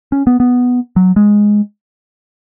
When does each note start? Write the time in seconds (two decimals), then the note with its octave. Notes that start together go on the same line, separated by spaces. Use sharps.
0.12 C#4
0.27 B3
0.40 B3
0.96 F#3
1.16 G#3